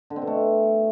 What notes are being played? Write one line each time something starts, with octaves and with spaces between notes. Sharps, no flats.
D3
C4
B2
A3